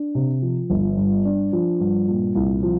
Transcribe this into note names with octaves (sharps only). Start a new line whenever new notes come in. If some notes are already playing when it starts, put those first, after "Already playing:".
Already playing: D4
C3
F3
G1
G2
D4
F3
G2
A#2
C2
F3